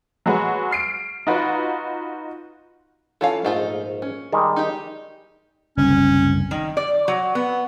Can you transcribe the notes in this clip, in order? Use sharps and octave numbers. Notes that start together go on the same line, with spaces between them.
F#3 G#3 F#4 B4
F6 C7 D7
D#4 F4 F#4 B4
E3 C#4 F4 A4 C#5 F5
A#1 G#2 A3 D#4 F4
C#4
D#3 G3 G#3
D#4 G4
F#1 C2 D3 C#4
D#3
D5
F#3
B3